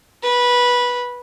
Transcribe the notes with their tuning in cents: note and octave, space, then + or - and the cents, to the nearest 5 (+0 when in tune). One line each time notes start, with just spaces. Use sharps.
B4 -15